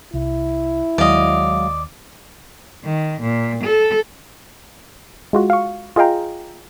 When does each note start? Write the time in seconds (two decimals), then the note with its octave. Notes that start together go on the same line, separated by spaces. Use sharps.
0.14 C2 E4
0.98 D#2 F#3 G#3 D5 D#5 F5
2.85 D#3
3.22 A#2
3.64 A4
5.33 G#3 F4 F#4
5.50 F5 C#6
5.96 F4 G#4 D#5 F5 G5 A#5